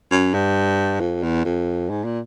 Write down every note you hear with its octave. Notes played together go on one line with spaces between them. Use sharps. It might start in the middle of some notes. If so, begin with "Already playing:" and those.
F#2
G2
F2
E2
F2
G#2
A#2